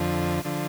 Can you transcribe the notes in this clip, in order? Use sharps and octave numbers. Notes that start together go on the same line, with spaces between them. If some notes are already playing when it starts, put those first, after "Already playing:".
Already playing: F2 D3 F3
D3 F3